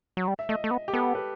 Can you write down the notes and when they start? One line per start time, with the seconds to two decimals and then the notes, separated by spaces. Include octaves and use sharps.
0.17 F#3
0.27 G3
0.39 E5
0.49 A3 D#5
0.64 A3
0.71 B3
0.88 G4
0.93 B3 A4
1.15 B4